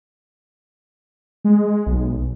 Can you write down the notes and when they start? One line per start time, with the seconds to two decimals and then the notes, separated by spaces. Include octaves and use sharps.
1.45 G#3
1.86 B1